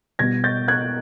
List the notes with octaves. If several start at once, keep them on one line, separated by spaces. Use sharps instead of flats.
B2 G3 B3 G#6 A#6
G6 A6
F#6 G#6